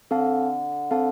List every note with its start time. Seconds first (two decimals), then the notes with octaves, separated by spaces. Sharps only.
0.11 D3 C4 A4 F5 A5
0.91 C4 A4 F5 A5